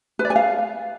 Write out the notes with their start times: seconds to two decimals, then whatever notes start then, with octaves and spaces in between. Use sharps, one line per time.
0.19 B4
0.25 D5
0.30 G#5
0.36 F5